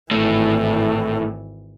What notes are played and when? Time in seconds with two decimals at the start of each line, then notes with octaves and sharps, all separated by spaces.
0.11 G#1 A2 E3